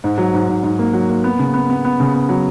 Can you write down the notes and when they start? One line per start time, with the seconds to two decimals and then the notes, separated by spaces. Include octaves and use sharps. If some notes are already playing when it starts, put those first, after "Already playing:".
0.04 G#2
0.18 F#3
0.34 G#2
0.49 G#2
0.63 G#2
0.79 A#3
0.93 F#3
1.09 A#3
1.24 B3
1.39 C#3
1.54 B3
1.70 B3
1.85 B3
2.00 C#3
2.15 B3
2.29 F#3